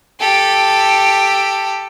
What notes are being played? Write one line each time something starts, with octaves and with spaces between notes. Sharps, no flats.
G4 A4